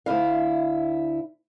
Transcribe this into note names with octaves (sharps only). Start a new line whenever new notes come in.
D2 G2 E4 F5